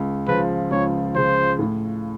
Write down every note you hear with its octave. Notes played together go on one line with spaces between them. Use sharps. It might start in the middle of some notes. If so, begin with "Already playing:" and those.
Already playing: C#2
C#3 F3 B4
C#2 C#5
C#3 F3 C5
A2